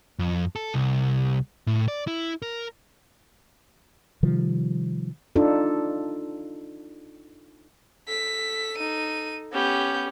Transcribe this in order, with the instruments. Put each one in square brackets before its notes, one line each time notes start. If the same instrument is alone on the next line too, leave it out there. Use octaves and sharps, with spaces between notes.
[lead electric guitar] F2
A4
C2
A2
D5
E4
A#4
[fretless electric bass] C3 D#3 F3 G3
[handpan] D4 D#4 F4 A4
[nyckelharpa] A4 [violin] B6
[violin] D#4 D#7
[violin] B3 G6 [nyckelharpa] C#4 G4